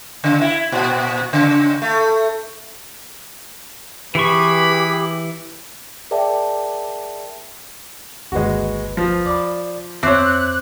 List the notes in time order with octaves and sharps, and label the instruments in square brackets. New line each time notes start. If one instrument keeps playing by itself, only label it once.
[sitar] C#3
E4
A#2
C#3
A3
[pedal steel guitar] E3 C#6 [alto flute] G4 [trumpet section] G#4 B4 B5
[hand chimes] G#4 A#4 D5 E5 G5 A5
[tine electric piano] G1 D#2 B4 [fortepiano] G#3 F#4
[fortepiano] F3
[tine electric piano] D5 B5
[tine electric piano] F2 D6 [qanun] C4 [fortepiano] C#5 E5 [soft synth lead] F#6